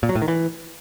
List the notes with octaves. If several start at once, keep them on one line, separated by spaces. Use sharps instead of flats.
A#2
F#3
A2
D#3
E3